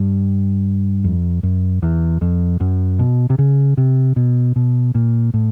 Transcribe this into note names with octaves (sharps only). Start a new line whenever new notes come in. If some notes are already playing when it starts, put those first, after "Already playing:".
Already playing: G2
F2
F#2
E2
F2
F#2
B2
C3
C#3
C3
B2
B2
A#2
A2